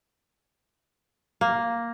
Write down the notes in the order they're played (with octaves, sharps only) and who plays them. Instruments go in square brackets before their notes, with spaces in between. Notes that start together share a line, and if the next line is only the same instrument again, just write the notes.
[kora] A#3